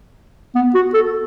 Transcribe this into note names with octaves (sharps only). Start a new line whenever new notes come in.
B3
F#4
A4